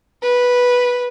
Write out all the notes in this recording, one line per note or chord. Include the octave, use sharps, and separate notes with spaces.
B4